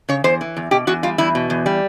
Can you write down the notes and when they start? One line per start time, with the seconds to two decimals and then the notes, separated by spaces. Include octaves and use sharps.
0.09 C#3 C#5
0.24 E2 C5
0.41 E3
0.57 E2
0.71 B2 G4
0.87 E2 F#4
1.03 G3 F4
1.18 E2 E4
1.35 B2
1.50 E2
1.66 G3